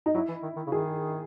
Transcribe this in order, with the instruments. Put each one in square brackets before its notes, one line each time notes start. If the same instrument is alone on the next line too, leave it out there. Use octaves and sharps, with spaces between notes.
[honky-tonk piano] D#4
[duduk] F#3 [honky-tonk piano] E4
[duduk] E3
D#3
D#3
C#3
[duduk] D#3 [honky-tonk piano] G#4